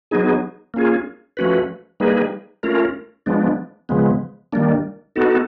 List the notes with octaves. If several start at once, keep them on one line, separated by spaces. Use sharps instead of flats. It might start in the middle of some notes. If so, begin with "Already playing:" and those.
F#3 B3 D#4 G#4
A#3 C#4 F4 G#4
F3 A3 C#4 F#4 B4
G3 A#3 D#4 G#4 B4
A3 C#4 F4 A#4
F3 G#3 B3 D4
C#3 F3 G#3 B3
D#3 G3 A#3 D4
B3 D#4 F#4 A4